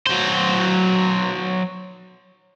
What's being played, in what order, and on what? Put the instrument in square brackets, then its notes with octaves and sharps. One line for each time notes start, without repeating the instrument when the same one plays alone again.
[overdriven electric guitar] F#3 C5